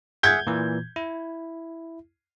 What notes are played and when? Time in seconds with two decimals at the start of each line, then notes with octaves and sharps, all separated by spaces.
0.23 G#4 E5 F#5 G6 G#6
0.47 A#2 E3
0.96 E4